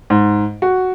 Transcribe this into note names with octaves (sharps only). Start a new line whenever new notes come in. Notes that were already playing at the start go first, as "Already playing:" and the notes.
G#2
F#4